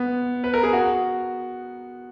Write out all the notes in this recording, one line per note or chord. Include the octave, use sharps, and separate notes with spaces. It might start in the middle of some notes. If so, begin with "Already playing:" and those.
Already playing: B3
B4
A#4
G#4
F#4